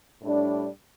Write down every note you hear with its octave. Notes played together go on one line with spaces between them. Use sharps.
A2 G3 D4